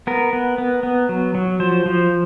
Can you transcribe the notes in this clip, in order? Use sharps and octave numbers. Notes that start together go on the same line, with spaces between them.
B3 A#4
B3
B3
B3
F#3
F#3
F3 C5
F3